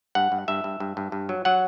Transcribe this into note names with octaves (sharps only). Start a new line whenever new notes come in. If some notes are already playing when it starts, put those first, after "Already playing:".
G2 F#5
G2
G2 E5
G2
G2
G2
G2
F#3
F#3 F#5